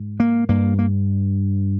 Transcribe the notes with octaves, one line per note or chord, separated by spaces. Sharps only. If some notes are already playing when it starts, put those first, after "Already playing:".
Already playing: G#2
A#3
G2 A#3
A#3